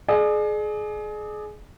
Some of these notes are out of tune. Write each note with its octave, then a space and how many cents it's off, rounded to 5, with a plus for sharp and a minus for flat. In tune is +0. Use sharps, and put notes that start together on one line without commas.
G#4 +30 D5 +40